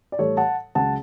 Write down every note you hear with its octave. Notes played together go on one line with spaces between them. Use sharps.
D5
A2 E3 G3 A4 C#5
F#5 A5
C#2 C#3 F#3 F#5 A5